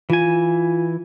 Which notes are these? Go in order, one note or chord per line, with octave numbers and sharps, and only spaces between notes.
E3 F4 G#5